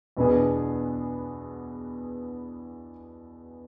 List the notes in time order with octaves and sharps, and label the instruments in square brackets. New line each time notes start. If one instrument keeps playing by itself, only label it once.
[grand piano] E2 B2 B3 D4 G#4